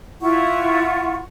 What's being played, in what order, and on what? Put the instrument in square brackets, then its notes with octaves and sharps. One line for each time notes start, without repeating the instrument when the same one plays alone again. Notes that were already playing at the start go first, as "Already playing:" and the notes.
[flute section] E4 F4 F#5 C#6